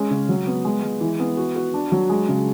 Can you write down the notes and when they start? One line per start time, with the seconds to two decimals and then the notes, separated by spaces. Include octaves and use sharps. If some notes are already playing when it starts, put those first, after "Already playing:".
Already playing: G#3 C#4
0.11 C#3
0.29 F#3
0.47 B3
0.65 G#3
0.83 G#3
1.01 E3
1.20 B3
1.37 F#4
1.56 F#4
1.74 D4
1.92 F#3
2.09 G#3
2.29 C#3